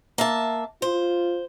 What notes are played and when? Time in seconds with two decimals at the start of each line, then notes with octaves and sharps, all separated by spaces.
0.18 A#3 E5 A5
0.82 F4 C5